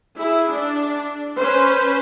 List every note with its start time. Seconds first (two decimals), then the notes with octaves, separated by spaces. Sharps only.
0.18 E4 G#4
0.51 D4
1.38 C#4 B4 C5